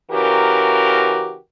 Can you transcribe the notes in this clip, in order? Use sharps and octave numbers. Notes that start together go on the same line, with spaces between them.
C#3 E3 F#4 G4 A#4